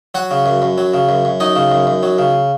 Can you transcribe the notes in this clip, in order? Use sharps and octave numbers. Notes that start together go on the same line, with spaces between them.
F#3 F#4 F#5
C#3
F#2
F#2
F#3
C#3
F#2
F#2
F#3 D#4 D#5
C#3
F#2
F#2
F#3
C#3